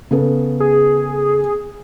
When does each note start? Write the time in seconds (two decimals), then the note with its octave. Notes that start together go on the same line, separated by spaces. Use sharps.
0.11 C#3 B3 A4
0.60 G#4